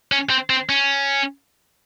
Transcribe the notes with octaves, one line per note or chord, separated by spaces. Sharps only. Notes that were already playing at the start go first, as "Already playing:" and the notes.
C#4
C4
C4
C#4